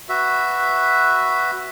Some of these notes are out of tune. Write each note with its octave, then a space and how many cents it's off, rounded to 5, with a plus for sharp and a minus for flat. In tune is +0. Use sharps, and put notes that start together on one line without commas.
F#4 +0 B4 +0 E5 +0